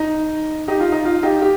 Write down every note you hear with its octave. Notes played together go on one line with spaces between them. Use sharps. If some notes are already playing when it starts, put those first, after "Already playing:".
Already playing: D#4
D#4 G4
F4
D#4
F4
D#4 G4
G4